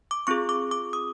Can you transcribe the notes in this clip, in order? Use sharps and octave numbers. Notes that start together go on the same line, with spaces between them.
D6
C4 F4 G#4 C#6
D6
D6
D#6